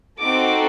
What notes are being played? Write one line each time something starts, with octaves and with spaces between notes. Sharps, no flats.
C4 D#4 F#4 A4 D6